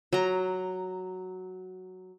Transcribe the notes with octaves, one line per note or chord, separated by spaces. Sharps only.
F#3 A#5